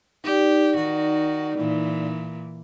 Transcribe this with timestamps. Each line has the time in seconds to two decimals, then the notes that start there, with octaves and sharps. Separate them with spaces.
0.24 D#4 G4 D5
0.75 D#3 F#4
1.57 A#2 E3